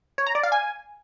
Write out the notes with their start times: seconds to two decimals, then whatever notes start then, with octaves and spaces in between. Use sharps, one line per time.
0.18 C#5
0.27 A#5
0.35 D5
0.43 F5
0.52 G#5